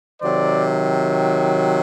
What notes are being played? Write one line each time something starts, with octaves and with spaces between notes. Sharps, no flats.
C3 D#3 F#3 C5 D5